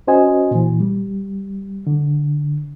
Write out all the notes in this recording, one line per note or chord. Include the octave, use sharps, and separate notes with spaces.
C#4 F#4 C5 D#5 G#5
A#2 E3
G3
D3